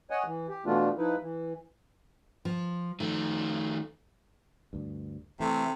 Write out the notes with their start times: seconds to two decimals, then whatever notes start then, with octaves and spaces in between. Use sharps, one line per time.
0.10 C#5 D#5 F#5 G#5
0.26 E3
0.49 G4
0.66 B2 E3 A3 B3 D4 F4
0.98 F3 D#4 E4 B4
1.22 E3
2.45 F3
3.00 D#3 F3 A3
4.73 D2 G2
5.40 C3 E3 A3